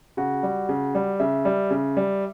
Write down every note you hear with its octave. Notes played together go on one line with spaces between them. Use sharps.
C#3 F#4
G3
C#3
G3
C#3 E5
G3
C#3
G3